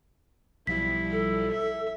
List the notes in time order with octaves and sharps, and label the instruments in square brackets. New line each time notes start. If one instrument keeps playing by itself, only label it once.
[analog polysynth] B1 F3 G3 [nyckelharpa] E4 [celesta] B6
[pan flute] A4
[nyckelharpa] E5